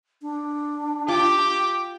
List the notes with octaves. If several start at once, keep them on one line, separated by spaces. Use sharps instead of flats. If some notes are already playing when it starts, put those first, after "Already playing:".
D4
F4 G4 G5 D6